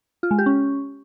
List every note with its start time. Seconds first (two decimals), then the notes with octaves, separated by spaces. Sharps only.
0.23 F4
0.31 G#3
0.38 G4
0.46 C#4